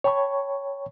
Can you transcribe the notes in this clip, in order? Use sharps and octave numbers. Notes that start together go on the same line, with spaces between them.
C#5 G5 A5 B5 C#6